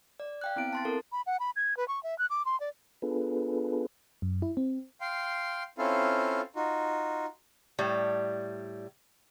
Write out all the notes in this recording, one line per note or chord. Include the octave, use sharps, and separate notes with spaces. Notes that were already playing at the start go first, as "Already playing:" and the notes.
D5
F5 G5 F#6
B3 C4 E4 D7
A5 C6 A6
C4 E4 A4 A#4
B5
F#5
B5
G#6
B4
C#6
E5
F#6
D6
C6
D5
B3 D4 F4 G#4 A4 B4
F#2
E4
C4
F5 G5 C6
C4 C#4 E4 F4 A4 F5
D#4 F4 F#4
A2 G3